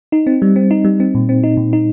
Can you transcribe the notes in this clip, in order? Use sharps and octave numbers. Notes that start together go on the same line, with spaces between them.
D#4
C4
G3
C4
D#4
G3
C4
A#2
C4
D#4
A#2
D#4